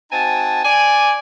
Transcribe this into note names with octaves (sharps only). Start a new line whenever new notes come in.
C4 D#4 F#4 G#5 A5
D5 G#5